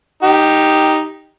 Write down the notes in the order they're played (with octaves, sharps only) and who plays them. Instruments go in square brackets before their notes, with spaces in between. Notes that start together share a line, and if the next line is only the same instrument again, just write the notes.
[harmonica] D#4 G4